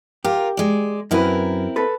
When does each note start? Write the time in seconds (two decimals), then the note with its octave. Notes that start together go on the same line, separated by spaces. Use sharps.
0.24 F4 G4 A#4
0.57 G#3 D5
1.11 F#2 C4 E4 A#4 B4
1.76 A4 B4